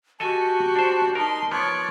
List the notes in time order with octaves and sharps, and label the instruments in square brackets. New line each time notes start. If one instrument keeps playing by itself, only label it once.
[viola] F#4 G4 [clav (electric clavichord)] A4 D#5 G#5 [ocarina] A5
[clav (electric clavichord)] D4 C5
[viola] D#4 C6 [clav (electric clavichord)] A#4
[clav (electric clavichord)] F3 B3 [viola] C#5 D5